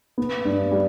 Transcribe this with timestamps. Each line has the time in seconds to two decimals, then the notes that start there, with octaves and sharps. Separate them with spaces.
0.18 B3
0.45 G2
0.71 G3